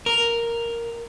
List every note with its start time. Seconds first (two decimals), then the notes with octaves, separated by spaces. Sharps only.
0.06 A#4